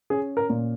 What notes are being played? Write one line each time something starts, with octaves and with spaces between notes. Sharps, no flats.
C#4 G#4
A#4
A#2